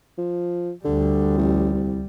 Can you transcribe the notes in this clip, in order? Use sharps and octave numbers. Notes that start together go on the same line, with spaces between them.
F3
D2 D3 G3
A1
C2